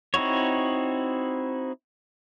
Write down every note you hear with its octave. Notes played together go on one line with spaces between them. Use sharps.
C4 D#4 E4 F#4 C#5